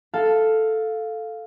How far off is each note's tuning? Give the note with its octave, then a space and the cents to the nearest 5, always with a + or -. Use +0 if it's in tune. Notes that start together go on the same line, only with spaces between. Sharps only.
A4 +0 F5 +5